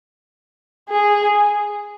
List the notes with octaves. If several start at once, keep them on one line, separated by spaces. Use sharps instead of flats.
G#4